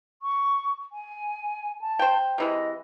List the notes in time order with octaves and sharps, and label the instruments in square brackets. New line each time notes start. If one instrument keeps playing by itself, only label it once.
[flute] C#6
G#5
A5
[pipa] C5 G5
[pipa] C3 E3 G#3 [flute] D#5